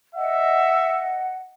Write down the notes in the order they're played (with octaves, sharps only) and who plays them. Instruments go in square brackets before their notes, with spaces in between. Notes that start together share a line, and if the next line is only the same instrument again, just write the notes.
[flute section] D#5 F#5 [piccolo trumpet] E5